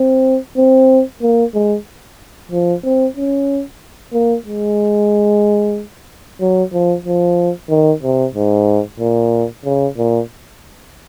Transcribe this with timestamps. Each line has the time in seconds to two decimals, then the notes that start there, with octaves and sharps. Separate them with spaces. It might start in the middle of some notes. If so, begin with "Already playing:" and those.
Already playing: C4
0.57 C4
1.22 A#3
1.54 G#3
2.51 F3
2.84 C4
3.17 C#4
4.13 A#3
4.46 G#3
6.41 F#3
6.73 F3
7.05 F3
7.69 D#3
8.03 C3
8.35 G#2
8.99 A#2
9.65 C#3
9.97 A#2